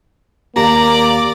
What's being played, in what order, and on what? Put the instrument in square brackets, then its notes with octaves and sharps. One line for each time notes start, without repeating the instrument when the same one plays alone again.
[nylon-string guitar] D#2 G4 A5 [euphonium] A#3 [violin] D5 [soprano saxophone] A#5